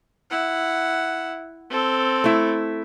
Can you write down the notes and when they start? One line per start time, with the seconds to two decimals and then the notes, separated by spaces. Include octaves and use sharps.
0.30 E4 F#5
1.70 C4 A4
2.24 A3 E4